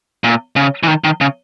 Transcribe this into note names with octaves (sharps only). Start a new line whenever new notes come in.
A#2
C#3
E3
D#3
D#3
C#3